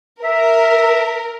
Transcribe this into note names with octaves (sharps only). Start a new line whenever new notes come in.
A#4 E5